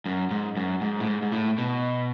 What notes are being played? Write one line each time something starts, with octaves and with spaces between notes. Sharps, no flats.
F#2
G#2
F#2
G#2
A2
G#2
G#2
A2
B2